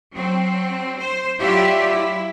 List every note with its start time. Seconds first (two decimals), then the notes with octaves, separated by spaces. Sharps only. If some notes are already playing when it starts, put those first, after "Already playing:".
0.14 F#3 C4
1.00 C5
1.40 F#3 E4 F4 G4 D5 E5
1.91 E4